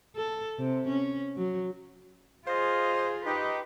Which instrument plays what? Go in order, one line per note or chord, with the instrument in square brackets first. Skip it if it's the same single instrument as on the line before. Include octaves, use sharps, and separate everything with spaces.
[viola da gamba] A4
C3
C#4
F#3
[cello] F4 G#4 [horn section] C5 D#5 F5
[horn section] D#4 G4 [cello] B4